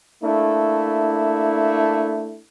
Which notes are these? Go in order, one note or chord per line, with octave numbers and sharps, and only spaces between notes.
A3 A#3 D4 E4